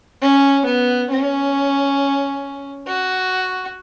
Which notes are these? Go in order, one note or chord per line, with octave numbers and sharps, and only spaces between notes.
C#4
B3
C#4
F#4